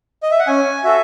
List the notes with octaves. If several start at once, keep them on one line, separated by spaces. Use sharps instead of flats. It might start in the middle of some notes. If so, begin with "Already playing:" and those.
D#5
E5
F#5
C#4 G#5
F#4 A4 E5